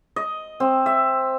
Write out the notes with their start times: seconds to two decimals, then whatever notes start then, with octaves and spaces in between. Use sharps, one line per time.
0.16 D#5
0.60 C4
0.86 E5